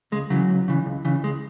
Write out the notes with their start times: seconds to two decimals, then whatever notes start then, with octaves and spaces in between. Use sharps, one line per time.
0.12 C#2 G#3
0.30 C#3 E3 F#3
0.49 C#2
0.68 C#3 E3
0.86 C#2
1.05 C#3 E3
1.23 C#2 G#3